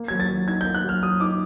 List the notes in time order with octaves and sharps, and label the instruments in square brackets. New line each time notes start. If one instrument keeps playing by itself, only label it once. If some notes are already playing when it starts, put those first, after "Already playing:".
Already playing: [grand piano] A#3
F#3 G#6
A6
F#3
D#4 G#6
G6
A#3
F#6
F#3 F6
F#3 D#6
D#4 D6